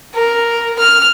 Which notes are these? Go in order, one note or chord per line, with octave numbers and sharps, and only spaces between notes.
A#4
F6